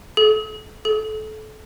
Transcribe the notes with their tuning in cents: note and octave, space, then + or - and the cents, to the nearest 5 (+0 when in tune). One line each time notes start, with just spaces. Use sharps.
A4 -30
A4 -25